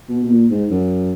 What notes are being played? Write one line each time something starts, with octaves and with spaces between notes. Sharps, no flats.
B2
B2
A#2
G#2
F#2